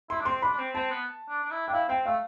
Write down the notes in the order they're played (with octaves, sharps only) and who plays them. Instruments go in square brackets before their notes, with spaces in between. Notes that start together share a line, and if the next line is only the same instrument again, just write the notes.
[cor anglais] E4 [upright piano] C6
[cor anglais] D4
[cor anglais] C4 [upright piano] C6
[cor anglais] D4 [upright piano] B5
[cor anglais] D4
C4
[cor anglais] C4 [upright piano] A5
[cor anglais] B3
D4
D4
E4
[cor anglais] D4 [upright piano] G5
[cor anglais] E4 [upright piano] F5
[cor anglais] C4 [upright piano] G5
[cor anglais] A3 [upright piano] F5